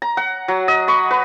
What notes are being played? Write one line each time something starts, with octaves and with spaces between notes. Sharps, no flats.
A#5
F#5
F#3
D#5
B5 C#6
B4